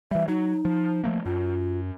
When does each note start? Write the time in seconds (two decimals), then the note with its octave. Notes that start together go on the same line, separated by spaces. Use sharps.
0.11 E3 G3 E5
0.28 F#3 D#4
0.65 F3
1.04 F3 A3 A#3
1.26 F#2 F4